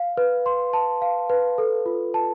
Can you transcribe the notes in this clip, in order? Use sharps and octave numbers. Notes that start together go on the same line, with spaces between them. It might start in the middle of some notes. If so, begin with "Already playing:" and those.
Already playing: F5
B4
C6
A5
F5
B4
A4
F4
A5